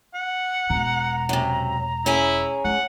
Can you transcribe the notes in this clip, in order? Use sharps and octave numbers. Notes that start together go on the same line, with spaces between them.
F#5
E1 B2 A#5
F#2 C3
C#4 E4 G#4 G#5
E4 F#5